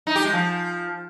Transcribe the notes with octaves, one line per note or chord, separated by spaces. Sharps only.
D#4
G4
G#3
F3